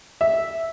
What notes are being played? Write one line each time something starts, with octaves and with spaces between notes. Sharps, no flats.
E5